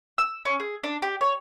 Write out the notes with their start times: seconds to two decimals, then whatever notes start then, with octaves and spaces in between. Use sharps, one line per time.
0.18 E6
0.45 C#4
0.60 G#4
0.84 D4
1.02 G4
1.21 C#5